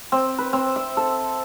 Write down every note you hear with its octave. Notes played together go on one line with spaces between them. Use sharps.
C4
B4
C4
E5
A4